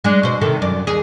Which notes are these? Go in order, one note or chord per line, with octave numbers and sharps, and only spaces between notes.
G#3 D4
B2 C5
C3 D#3 A4
F#2 D5
D#2 G#4